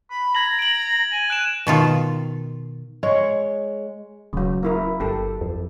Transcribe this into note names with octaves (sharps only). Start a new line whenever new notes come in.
B5
A#5 G#6 F#7
D7 F#7
G#5
F#6 D7 E7
B2 D#3 F4
G#3 C#5
D#1 C#3 F#3
A#3 E4 A#4
G1 G4 A4
F2